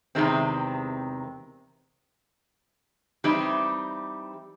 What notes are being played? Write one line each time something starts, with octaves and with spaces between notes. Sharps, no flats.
E2 C3 D#3 G#3 C4
E3 G3 C4 D#4 G4